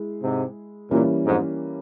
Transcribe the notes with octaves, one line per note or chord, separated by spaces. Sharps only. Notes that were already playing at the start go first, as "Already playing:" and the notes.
Already playing: G#3 E4 G#4
G#2 C3
G2 A#2 E3 G3 A#3 C#4
F2 G#2